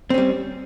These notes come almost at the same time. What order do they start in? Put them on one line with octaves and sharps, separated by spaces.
C4 C#4 G3